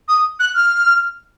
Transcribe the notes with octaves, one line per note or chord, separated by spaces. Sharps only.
D#6
F#6
F6